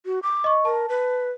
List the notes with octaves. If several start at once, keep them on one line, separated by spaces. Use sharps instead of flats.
F#4
D6
D#5 C#6
A#4 A5
B4